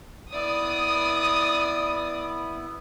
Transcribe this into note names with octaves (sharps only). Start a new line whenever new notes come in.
B3 E4 D5 D#6